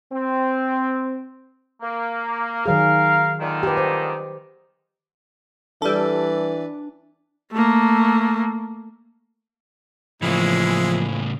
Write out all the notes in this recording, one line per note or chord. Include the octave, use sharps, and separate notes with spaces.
C4
A#3
D#3 F#3 G#4 A#4 F5
A#2 D3 D#3
G4 B4
C5
E3 G3 D4 A4 B4 D5
A3 A#3
A2 C#3 E3 F3 G#3 A#3 E4